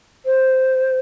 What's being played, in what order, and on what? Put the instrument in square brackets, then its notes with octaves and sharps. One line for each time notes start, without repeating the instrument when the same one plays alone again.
[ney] C5